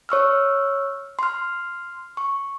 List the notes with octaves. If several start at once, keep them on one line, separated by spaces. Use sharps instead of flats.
C#5 C#6 E6 F6
C6 F6
C#6